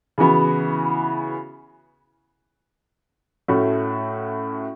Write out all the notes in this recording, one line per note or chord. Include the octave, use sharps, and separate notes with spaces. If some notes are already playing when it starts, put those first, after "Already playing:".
C#3 E3 B3 F#4
A2 A3 C#4 F#4